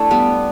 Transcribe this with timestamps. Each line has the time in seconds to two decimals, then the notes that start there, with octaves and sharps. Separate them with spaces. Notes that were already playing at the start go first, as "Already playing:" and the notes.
Already playing: A3 D4 E4
0.11 G3 B3